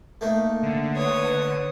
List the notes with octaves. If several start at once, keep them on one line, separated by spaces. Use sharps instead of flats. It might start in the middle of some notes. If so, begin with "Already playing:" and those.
A3 A#3 D#4
D3
B4 C#5 D#6